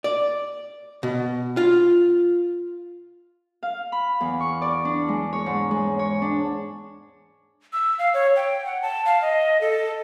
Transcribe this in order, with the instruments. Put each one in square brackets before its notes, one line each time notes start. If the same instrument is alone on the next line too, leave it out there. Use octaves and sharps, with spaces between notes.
[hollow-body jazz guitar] D5
B2
F4
[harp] F5
B5
E2
C#6
D5
D4
G#3
C#5
G#2
G#3
C#5
D4
[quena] E6
F5
C#5
G5
F#5
A5
F5
D#5
A4